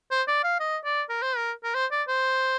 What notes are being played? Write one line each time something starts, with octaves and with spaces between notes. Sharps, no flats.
C5
D5
F5
D#5
D5
A#4
C5
A#4
A#4
C5
D5
C5